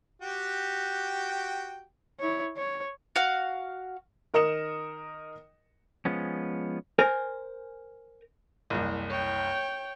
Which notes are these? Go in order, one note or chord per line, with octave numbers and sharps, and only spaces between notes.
F#4 G4 G5
E4 C#5
C#5
F#4 F5
D#3 A#4 D#5 D#6 C#7 E7
F3 G#3 B3 C#4
A#4 C5 G#5
F#1 C2
C#5 G5